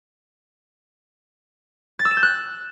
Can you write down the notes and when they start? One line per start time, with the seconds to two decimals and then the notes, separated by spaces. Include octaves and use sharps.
1.99 A6
2.05 E6
2.11 E7
2.17 G6
2.23 F#6